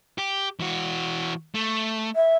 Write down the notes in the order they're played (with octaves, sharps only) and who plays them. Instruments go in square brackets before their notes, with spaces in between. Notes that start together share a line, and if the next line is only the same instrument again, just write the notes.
[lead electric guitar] G4
E3 F#4
A3
[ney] E5